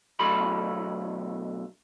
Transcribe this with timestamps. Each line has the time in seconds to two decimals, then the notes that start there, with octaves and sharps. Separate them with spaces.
0.19 B1 D3 F#3 A3 B5 C6